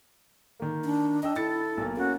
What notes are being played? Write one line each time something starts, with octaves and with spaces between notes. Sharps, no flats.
D#3 A#3
D4
D4 D#5 G5 E6
E4 A4 A6 C#7
B1 A#3
A#3 C#4 F#4